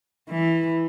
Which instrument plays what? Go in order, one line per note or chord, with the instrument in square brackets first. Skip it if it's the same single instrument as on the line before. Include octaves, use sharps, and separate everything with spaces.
[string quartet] E3